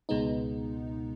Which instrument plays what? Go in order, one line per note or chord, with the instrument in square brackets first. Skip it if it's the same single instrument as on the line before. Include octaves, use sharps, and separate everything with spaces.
[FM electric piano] C#2 B2 G#3 B3 D#4